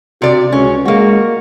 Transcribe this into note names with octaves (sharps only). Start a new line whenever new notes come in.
C3 F#4 D5
C#2 C#4
G#3 A#3 F#4